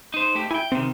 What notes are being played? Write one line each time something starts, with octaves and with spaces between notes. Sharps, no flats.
D#4 C5
A3 G4
E4 G5 G#5
C3 D#3 C4